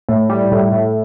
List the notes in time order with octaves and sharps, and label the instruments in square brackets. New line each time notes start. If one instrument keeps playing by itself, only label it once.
[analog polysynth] A2
G3
A2
A2